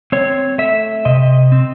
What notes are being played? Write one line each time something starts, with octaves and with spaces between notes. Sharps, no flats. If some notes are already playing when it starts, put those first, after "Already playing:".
C4 C#5
A3 E5
C3 D#5
C4